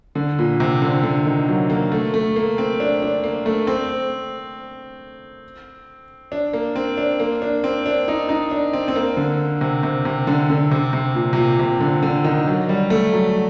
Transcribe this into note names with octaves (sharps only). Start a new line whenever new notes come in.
D3
A#2
C3
D3
D3
D#3
F#3
A#3
A3
A3
A#3
C4
D4
D4
A#3
A3
C4
D4
A#3
C4
D4
A#3
D4
C4
D4
D#4
D#4
D4
C4
C4
A#3
D3
C3
C3
C3
D3
D3
C3
C3
A#2
C3
A#2
C3
D3
D3
D#3
F#3
G3
A3
F#3